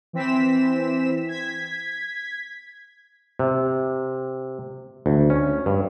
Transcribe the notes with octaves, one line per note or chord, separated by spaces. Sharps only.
E3 C4 B6 E7
G#6 B6
C3
D2
C#4
G2